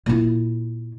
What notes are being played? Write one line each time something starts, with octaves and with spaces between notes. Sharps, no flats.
A#2 E4